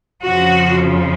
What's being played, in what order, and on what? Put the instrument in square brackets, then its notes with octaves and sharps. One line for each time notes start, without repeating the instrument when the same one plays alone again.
[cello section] F2 C#3 F3 F#4